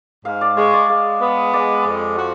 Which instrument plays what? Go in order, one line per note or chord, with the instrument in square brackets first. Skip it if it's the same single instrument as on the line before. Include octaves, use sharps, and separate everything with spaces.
[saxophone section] G#2 [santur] F5
[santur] D5
[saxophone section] G#3 [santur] C#5
[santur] D5
[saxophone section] G#3 [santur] F5
[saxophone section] B3
[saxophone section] G#3 [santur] D5
[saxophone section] F2
F#4